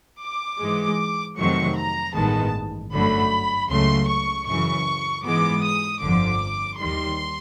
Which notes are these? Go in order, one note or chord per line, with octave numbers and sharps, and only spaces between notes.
D6
G#2 E3 G#3
F2 C3 D#3 F#3 A3 C#6
A#5
A1 G2 D#3 G#3 B3 A5
G1 F#2 D3 F#3 A3 B5
C#2 C#3 F#3 A3 C6
C#6
F#2 C#3 E3 C#6
G#2 E3 G#3 B3 D6
D#6
G1 F2 D3 F3 D6
D#2 D#3 G3 C6